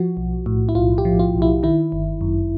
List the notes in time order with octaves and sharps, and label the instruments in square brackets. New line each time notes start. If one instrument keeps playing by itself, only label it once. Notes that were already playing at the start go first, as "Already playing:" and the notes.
Already playing: [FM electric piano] F3 F#4
B1
A2
E4
B1 F4
G4
F3
F4
B1
E4
D#3 E4
G1
F#2